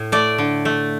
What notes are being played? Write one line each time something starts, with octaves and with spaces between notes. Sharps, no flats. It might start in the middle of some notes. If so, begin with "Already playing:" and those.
Already playing: A2
A3 D5
D3
A3